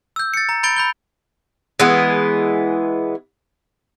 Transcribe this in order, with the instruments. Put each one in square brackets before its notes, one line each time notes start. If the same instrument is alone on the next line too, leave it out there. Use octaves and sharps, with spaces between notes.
[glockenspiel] E6 G6
A6 C#7
A#5
B5 G6 A6 D7 G7
B5 G6 G7
[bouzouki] E3 G#3 B3